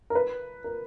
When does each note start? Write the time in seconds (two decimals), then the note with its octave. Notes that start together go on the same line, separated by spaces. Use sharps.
0.10 A#4
0.15 B4
0.64 A#4